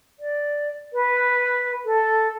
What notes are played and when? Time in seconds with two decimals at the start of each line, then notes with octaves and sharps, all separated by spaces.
0.20 D5
0.93 B4
1.85 A4